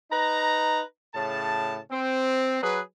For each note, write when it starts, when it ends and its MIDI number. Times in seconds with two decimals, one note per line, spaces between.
0.11 0.81 63
0.11 0.81 71
0.11 0.81 82
1.14 1.78 45
1.14 1.78 49
1.14 1.78 81
1.91 2.60 60
2.63 2.80 54
2.63 2.80 68
2.63 2.80 71